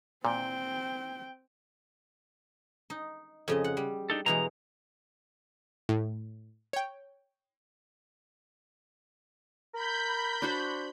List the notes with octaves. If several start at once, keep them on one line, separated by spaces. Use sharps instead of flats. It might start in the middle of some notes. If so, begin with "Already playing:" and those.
A#2 C4 G5
D#4
F2 C#3 D#5
F#5
G3
D4 D#4 A4
B2 E3 G#3 A#5
A2
C#5 G5
A#4 B5 G6
D4 F#4 C5